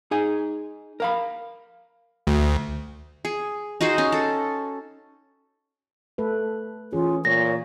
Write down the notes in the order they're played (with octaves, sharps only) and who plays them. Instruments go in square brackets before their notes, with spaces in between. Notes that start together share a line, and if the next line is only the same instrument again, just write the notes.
[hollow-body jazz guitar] D#4 G#4 G#5
A#4 F5 B5
[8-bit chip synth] D2
[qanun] G#4
D#4 F#4 G#4 C5
C#4
A4
[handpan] A3 A4 B4
[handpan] E3 G#4 [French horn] C#4 [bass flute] F4
[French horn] A#2 [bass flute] C#5 [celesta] A#6